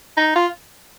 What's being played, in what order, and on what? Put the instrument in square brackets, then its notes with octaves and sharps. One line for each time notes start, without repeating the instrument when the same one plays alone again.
[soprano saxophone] D#4
F4